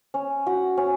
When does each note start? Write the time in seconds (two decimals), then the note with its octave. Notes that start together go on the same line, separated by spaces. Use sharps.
0.14 C#4
0.47 F#4
0.77 C#4